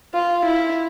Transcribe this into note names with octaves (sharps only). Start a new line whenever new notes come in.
F4
E4